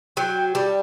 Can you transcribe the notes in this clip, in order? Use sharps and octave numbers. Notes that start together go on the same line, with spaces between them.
F#3 G5
G3 A5